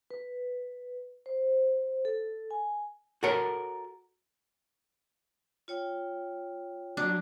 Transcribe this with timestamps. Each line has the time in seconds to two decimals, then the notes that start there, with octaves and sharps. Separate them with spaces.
0.11 B4
1.26 C5
2.05 A4
2.51 G#5
3.23 F#4 A4 A#4 C#5
5.68 F4 C#5 G5
6.97 F#3 D4